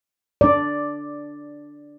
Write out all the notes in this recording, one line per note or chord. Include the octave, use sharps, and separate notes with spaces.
D4 D5